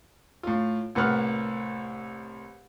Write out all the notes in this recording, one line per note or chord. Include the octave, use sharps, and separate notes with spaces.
A2 F4
C2 A2 A#3 B4 F#5 F6